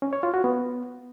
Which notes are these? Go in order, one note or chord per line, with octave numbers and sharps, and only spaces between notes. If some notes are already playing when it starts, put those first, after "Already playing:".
C#4
C#5
F4
F#4
B3